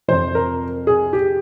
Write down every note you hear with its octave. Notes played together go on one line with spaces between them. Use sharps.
F2 C3 F3 C5
A#4
G#4
G4